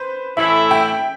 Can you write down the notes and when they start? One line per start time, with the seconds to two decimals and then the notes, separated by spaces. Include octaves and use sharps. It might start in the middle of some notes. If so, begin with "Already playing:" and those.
Already playing: B4 C5
0.37 A2 E3 A3 E4 E5
0.71 G5